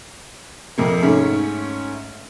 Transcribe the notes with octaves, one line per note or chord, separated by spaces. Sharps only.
F2 C3 A#3
G#2 A3 C#4